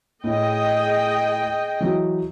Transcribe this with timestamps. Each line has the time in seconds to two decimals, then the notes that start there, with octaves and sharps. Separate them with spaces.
0.24 A2 G#4 D#5 G5
1.80 E3 F#3